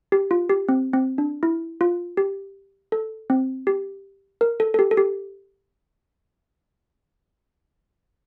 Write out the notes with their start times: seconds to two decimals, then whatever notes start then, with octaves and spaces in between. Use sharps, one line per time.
0.12 G4
0.31 F4
0.49 G4
0.69 C4
0.93 C4
1.18 D4
1.43 E4
1.81 F4
2.17 G4
2.92 A4
3.30 C4
3.67 G4
4.41 A#4
4.60 A4
4.74 A4
4.79 G4
4.91 A4
4.97 G4